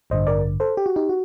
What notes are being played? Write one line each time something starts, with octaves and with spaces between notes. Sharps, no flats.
A1 G2 D3 C5 D#5
A#4 D5
A4 C5
G4
F#4
D#4 G4
F#4